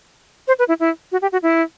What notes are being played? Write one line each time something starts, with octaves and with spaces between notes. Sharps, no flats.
C5
B4
E4
E4
F#4
G4
F#4
E4